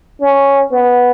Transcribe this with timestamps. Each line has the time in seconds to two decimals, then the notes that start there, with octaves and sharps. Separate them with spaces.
0.21 C#4
0.72 B3